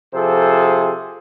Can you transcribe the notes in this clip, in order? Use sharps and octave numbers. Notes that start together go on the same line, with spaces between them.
C3 F3 G#4 A4 C5